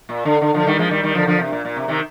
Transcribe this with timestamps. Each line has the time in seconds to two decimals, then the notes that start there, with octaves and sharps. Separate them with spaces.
0.09 A#2
0.25 D3
0.42 D3
0.54 D3 F3
0.67 D#3 G3
0.79 F3 G#3
0.91 D#3 G3
1.03 D#3 G3
1.15 D3 F3
1.27 D3 F3
1.40 C3
1.52 A#2
1.65 A#2
1.76 C3
1.88 C3 D#3